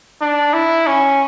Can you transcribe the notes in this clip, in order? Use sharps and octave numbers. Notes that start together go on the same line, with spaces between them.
D4
E4
C#4